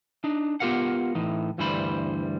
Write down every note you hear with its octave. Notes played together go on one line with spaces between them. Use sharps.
D4 D#4
B3 F4 G4 A#4 F5 F#5
A2 E3 D#4
D2 G2 E3 G3 C5 B5